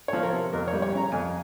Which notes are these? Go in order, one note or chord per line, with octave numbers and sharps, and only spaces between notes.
F3 C#5
A#4
C3
F2 A#4
C#5
G3
C#5
C#3 A#5
F2 G#5